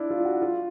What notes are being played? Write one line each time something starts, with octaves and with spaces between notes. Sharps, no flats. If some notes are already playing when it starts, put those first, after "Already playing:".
Already playing: D4 E4
F4
F#4
F4